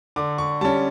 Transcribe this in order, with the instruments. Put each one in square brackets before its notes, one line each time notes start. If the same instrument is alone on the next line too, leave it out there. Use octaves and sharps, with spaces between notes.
[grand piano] D3 D6
C#6
G3 C#4 A5